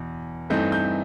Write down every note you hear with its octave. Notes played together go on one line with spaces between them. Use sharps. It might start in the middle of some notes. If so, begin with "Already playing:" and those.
Already playing: E2 B2
G2 E3 A3 C4 D#4 G6
G6